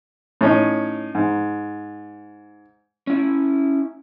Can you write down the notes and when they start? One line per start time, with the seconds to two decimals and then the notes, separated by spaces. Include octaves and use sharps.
0.41 A2 C#4 D#4
1.15 G#2
3.07 C#4 E4